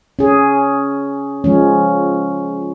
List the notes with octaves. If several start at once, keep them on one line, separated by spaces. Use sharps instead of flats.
C#4 G#4
F3 G#3 C#4